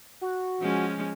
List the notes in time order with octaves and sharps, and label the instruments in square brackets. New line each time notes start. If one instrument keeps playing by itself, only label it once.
[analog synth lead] F#4
[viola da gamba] F3 G#3 C#4